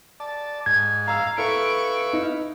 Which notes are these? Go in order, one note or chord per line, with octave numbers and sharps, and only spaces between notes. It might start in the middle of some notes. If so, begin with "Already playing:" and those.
D5 A5
G#2 G#6
F5 A#5 E6
E4 A4 B4 F5 C#6 D7
D#4